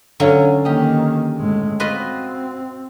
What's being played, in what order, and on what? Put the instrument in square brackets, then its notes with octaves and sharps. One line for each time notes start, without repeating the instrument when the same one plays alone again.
[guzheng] D3 F#3 C#4 [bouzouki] C#5 F5 A5
[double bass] D#3 A#3 [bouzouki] G4 D#5
[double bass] A2 G#3
[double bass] C4 [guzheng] F4 B4 D#5 [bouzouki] F#4